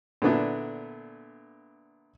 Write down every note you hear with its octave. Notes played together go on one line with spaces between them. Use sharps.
A#2 D3 B3 D4 E4